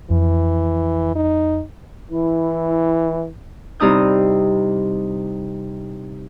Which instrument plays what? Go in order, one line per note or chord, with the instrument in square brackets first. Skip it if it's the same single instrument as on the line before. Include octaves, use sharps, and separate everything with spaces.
[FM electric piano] F2 [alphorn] E3
[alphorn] D#4
[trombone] E3 [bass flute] E4
[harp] C3 G3 D#4 E4 D#6 G6